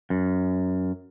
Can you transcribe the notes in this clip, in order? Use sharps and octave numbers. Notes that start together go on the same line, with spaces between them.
F#2